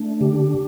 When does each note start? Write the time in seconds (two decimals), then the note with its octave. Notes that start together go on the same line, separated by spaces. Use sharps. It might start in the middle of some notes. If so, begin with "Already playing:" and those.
Already playing: A3 D4
0.21 D3 G4